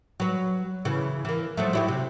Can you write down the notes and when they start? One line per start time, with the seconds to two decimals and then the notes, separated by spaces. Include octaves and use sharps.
0.20 F#3 B4
0.85 C#3 E3
1.25 E3 A#3
1.57 F3 F#3 A3
1.73 F#3 E4 G4
1.88 C3